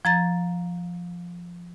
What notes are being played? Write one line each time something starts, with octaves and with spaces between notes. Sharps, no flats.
F3 A#5 A6